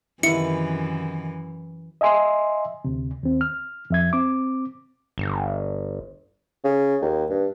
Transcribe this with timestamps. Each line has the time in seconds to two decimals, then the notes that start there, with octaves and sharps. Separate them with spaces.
0.23 F#2 C3 D#3 E3 B3 E4 E5 C#7
2.01 D#5 E5 G#5 C6
2.85 D2 C3
3.23 D#2 C4
3.41 F6
3.90 F2 E5 G#6
4.13 C4 D6
5.18 G1
6.65 C#3
7.02 D#2
7.30 G2